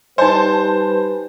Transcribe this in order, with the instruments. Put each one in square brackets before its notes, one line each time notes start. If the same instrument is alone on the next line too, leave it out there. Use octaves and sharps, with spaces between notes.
[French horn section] G3 B4 [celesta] D#4 G#5 [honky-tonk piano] C5 A5